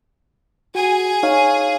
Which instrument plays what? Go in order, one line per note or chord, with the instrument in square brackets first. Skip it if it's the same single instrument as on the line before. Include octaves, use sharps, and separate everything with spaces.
[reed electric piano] F#4 [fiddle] G#4 G#5
[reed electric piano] D#4 C#5 F5